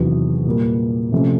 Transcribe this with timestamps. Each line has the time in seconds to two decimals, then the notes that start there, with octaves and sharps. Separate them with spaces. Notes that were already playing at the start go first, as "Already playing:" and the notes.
Already playing: E2 C3 D#3 F#3
0.45 A#2 G3 A#3
1.12 C3 F3 A3 C#4